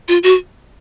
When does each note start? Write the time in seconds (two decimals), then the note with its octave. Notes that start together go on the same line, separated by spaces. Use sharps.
0.08 F4
0.23 F#4